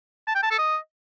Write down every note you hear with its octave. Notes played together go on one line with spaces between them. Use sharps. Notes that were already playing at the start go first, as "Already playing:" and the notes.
A5
G5
A5
A4
D#5